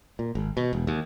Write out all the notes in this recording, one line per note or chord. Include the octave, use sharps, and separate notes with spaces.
A#2
G#1
B2
E1
D#2